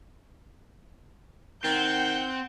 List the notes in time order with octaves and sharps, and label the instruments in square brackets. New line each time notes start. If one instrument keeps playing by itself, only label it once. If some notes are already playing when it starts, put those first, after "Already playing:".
[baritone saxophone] D#3 [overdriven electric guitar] C4 [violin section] F#5 G5 G6